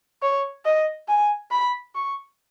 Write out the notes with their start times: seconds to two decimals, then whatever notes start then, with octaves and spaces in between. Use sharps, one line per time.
0.22 C#5
0.65 D#5
1.08 G#5
1.52 B5
1.95 C#6